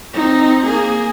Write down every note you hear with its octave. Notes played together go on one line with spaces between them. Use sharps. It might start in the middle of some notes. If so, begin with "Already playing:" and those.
C4 D#4
A#3 G#4